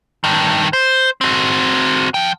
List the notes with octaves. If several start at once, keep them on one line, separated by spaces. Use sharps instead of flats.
G2 D#3
C5
C4 F#4
F3 G5